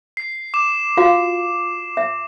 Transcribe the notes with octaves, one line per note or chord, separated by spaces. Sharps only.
C7
D6 E7
F4 F#4 F5
E5